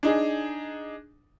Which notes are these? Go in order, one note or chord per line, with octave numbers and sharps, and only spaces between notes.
D4 D#4 G#4